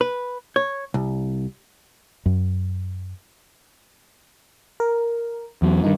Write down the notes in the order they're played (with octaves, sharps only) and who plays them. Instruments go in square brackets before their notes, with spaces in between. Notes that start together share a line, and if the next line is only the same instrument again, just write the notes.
[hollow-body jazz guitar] B4
C#5
C2
[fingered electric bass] F#2
[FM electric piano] A#4
[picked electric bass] E2 F#3
[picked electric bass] G2 [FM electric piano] D#3 D#4